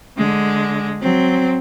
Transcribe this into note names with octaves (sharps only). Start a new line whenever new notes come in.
D3 G#3
F#3 C4